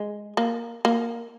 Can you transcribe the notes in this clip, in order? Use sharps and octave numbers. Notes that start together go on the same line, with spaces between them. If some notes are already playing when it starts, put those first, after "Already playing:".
Already playing: G#3
A#3
A#3